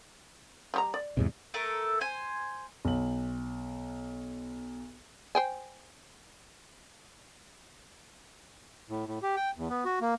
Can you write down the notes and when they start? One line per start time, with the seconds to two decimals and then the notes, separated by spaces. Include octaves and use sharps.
0.74 G3 G4 A#5
0.94 D5
1.17 E2 G#2 C3
1.54 A3 A4 A#4
2.01 C5 G#5
2.85 B1 F#7
5.35 C5 G5 G#5
8.89 A2
9.06 A2
9.22 G4
9.36 G5
9.57 E2
9.70 B3
9.85 F#4
10.01 A#3